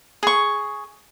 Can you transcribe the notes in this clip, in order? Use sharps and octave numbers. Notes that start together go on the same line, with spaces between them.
G#4 C#6